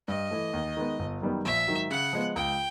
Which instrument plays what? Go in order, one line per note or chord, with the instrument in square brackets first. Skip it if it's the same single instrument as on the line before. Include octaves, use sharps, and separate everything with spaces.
[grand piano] G2 [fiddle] D#5
[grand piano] E3 A3
D#2
D#3 G#3 B3
G1
F#2 D#3 G3 B3
[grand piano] A#1 [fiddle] E5
[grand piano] G#2 D#3 F#3
[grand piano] C#3 [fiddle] F#5
[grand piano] F3 G#3 B3
[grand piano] C#2 [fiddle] G5